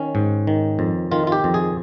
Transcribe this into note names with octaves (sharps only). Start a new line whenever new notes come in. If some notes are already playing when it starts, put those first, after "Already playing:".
Already playing: D#3 C#4
G#2
D#3
F2
D#3 F4
F4
G4
F2
G#4